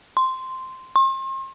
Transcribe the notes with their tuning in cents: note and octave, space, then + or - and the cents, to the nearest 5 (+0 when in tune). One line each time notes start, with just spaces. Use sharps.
C6 -5
C6 +40